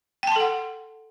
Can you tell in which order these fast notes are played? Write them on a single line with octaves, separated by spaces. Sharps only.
G5 A5 C6 A4 F#5